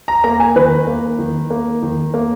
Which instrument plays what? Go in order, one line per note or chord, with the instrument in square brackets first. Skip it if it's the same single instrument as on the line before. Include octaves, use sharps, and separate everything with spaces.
[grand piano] A#5
A#3 A#5
G#5
D#3 B4
A#3
D#3
A#3
D#3
A#3